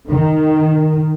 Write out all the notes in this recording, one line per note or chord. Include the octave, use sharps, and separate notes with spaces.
D#3